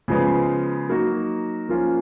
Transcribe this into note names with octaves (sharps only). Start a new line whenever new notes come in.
C#3 F3 G#3 B3
F#3 A#3 D#4 F#4
F3 A#3 C#4 F4